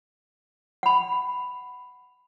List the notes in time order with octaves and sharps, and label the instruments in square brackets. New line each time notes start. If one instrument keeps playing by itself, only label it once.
[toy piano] F#5 B5